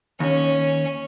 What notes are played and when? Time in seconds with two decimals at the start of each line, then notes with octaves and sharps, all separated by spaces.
0.20 D#2 C#4